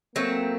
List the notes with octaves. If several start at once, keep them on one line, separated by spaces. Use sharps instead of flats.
F#3 A3 A#3 C4